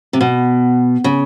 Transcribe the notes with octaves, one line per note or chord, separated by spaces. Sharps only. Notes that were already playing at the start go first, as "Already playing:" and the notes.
C3
B2
C#3